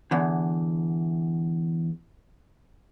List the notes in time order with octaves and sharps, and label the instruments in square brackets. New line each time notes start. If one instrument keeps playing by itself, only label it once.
[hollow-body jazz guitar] E2 D3